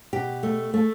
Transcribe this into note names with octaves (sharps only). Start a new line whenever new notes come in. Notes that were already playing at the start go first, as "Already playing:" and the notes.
B2 G4
A3
A3